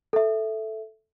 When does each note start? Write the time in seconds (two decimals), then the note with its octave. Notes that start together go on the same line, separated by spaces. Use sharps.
0.13 A4 E5